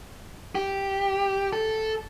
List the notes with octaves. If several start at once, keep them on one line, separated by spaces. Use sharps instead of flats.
G4
A4